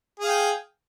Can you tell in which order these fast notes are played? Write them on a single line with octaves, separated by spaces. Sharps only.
G#4 F5 G5